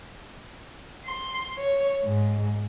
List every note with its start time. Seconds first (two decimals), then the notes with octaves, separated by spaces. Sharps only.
1.06 C6
1.58 C#5
2.04 G#2